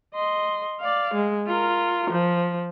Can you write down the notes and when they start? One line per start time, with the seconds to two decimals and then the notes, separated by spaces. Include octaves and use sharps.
0.15 D#5 C6
0.80 D5 F5
1.14 G#3
1.47 F4 A#4
2.10 F3